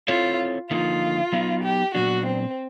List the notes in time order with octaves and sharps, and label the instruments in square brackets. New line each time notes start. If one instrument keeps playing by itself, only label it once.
[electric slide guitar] C4 E4 A4 C#5 [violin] F4
[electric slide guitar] D3 F3 A#3 D#4 [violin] F4
[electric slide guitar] F#3 B3 D#4
[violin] G4
[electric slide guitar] A#2 F#3 B3 D4 [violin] F#4
[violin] C4